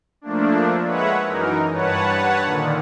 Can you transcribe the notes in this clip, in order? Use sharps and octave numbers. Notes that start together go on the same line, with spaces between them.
F3 A3 A#3 D4
G#3 B4 C#5 E5 F#5
F#2 E3 D#4 A#4
G2 B4 C#5 F#5 A5
A#2 D3 D#3